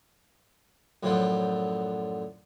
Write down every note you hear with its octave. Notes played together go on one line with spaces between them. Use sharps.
F#2 A2 D3 F3 F#3